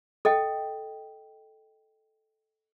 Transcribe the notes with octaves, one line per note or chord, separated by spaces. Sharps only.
A4 D#5 G5